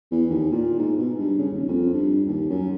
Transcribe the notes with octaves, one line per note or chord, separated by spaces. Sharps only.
E2
D#2
A#2
G#2
B2
G2
C#3
D#1
F2
G2
D#2
F#2